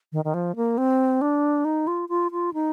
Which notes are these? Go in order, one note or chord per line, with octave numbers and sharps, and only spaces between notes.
D#3
D#3
F3
A#3
C4
D4
D#4
F4
F4
F4
D#4